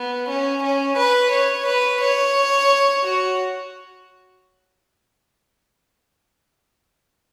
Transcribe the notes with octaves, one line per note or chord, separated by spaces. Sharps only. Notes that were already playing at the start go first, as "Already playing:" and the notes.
Already playing: B3
C#4
C#4
B4
C#5
B4
C#5
F#4